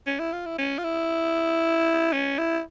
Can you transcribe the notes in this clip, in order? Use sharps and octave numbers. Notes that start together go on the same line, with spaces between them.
C#4
E4
F4
E4
C#4
F4
E4
C#4
E4